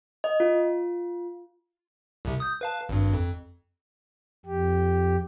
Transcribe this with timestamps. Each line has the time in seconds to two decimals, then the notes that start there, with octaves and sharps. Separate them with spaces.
0.24 D#5
0.40 F4
2.25 C2 C3
2.40 D#6 G6
2.61 B4 F5 A5
2.89 G#1 G2
3.13 F2
4.46 F2 G4